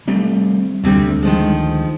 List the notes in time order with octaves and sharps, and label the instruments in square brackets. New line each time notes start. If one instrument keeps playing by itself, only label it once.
[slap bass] G3 A3 C4
[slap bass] D2 [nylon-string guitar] C3 G3 C4
[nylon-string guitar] D#3 F3 G#3